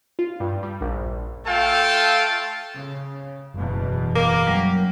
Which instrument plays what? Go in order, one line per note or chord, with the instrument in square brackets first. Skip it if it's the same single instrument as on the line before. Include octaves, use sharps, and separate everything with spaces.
[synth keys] F4
G2
G3
A#1
[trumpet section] A3 F4 A4 F5 G5 A5
[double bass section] C#3
[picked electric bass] F#1 [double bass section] E2 B2
[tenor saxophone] A#3 [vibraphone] D6
[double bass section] F#2 [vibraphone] F#3 G3